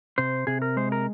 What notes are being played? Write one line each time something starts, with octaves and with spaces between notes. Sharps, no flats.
C3 C5
C3 G#4
A#4
G#3 C5
A#4